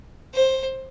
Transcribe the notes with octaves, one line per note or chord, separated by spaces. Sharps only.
C5